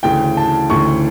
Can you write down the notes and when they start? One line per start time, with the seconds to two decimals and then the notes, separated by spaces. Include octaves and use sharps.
0.03 D2 C#3 E3 G5
0.37 A5
0.70 D2 C#3 E3 C#6